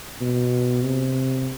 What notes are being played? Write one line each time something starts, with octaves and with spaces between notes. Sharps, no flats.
B2
C3